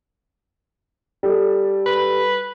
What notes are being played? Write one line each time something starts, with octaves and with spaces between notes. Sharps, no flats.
G3 A4
B4